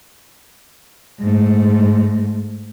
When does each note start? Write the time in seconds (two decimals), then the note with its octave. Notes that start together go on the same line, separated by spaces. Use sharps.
1.21 G#2 A3